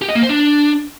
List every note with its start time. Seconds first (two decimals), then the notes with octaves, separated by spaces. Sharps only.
0.02 G4
0.08 D#5
0.15 A#3
0.22 C5
0.29 D4